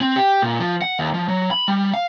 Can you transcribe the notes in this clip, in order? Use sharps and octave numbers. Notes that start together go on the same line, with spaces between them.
C4
G4
A#2
F3
F#5
D#2
F3
F#3
B5
G3
F5